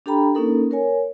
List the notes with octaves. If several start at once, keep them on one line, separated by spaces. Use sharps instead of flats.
D4 G4 A4 G5 A#5 B5
A#3 C#4 D#4 A4 A#4
A#4 C#5 G#5